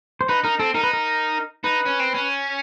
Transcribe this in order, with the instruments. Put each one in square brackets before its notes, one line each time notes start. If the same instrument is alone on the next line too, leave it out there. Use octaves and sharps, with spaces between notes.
[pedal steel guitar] C5
[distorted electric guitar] D#4 [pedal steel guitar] B4
[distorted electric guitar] D#4 [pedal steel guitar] A#4
[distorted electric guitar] C4 [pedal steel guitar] A4
[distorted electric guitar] D#4 [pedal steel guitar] A#4
[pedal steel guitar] B4
A#4
[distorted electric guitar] D#4 [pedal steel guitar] B4
[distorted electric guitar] C#4
C4
C#4